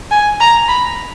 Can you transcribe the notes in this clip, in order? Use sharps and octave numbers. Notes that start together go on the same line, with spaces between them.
G#5
A#5
B5